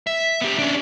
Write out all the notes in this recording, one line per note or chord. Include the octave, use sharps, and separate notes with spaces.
E5
B3 G4
C#4 D4